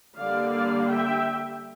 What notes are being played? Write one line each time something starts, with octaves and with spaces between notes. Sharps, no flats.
D3 G3 A#3 D5 F5
E5 G5